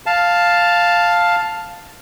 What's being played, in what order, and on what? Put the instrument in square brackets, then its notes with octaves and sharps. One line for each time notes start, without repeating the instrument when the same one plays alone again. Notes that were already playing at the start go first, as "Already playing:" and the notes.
[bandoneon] F5 A5